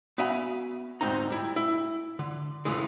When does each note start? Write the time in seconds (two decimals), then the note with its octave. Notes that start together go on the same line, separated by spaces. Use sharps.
0.18 B3 F#4 E5 F5 G#5 B5
1.01 D2 G#2 C4 D#4 A#5
1.30 G3 E4
1.56 E4
2.19 D3
2.65 F2 A2 C#3 E3 G#3